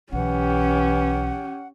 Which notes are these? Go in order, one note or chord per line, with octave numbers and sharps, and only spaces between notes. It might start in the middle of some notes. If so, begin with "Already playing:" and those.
B1 E3 C#4 G4 F#5